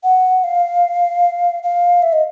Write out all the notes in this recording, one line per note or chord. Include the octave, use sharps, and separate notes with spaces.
F#5
F5
F5
E5
D#5